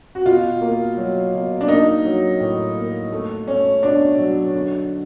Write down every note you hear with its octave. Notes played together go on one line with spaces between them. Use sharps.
F#4
B2 F4
A#3
F#3
B2
D4
A#3 D#4
F#3
A2
A#3
A3
A3 C#4
B2 D4
F#3
D3